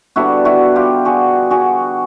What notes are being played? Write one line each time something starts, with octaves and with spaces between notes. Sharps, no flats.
D3 G3 B3 D4 E4 F#4
E4 F#4
F4 G4
F#4 G#4
F#4 G#4